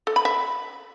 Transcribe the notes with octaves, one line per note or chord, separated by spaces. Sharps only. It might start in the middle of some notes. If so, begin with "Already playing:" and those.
A4
B5
E5